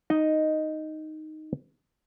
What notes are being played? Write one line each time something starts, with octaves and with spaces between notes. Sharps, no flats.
D#4 D#5